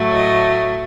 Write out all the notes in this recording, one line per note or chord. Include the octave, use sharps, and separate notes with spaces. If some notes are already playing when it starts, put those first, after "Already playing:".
Already playing: A2 F#3 A3
D#5